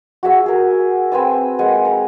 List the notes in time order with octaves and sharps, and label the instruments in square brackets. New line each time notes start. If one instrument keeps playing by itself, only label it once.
[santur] F#4 G#4 E5
G#4 A#4
C4 B4 G#5 E6
G#3 A#3 F#5 G#5
A#5